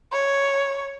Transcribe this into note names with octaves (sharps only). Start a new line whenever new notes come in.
C#5